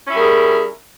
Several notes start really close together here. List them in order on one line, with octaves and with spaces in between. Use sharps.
C#4 E4 G3 A#4 G#4